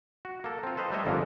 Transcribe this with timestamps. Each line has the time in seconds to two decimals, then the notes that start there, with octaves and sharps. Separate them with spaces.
0.25 F#4
0.44 A#3 A4
0.63 C4 F4
0.77 A4 B4 C5 D#5 F5 A#5
0.92 G3 A3 C5 C#5 D#5 E5
1.05 G1 F2 G#2 D3 A#3 F4